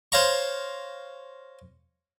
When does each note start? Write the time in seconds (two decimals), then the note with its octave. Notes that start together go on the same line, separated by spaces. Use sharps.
0.12 C5 C#5 F5 A#5 C#6